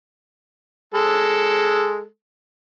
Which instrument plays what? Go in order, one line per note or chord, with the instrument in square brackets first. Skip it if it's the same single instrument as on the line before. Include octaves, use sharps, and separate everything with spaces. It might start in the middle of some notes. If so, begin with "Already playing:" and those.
[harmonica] G#3 A4